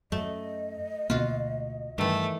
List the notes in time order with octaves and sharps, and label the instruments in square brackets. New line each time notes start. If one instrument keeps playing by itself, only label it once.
[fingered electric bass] F#2 [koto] A3 [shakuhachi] D#5
[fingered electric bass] D2 B2 A#3 [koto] F4 F#4
[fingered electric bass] G2 [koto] D#3 E3 [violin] A3